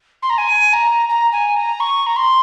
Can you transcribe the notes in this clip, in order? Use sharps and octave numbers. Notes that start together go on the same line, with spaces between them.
C6
A#5
G#5
A#5
A#5
G#5
A#5
C#6
A#5
C6